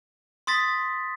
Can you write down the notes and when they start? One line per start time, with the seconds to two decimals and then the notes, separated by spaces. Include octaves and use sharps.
0.47 C6 D#6 A6 B6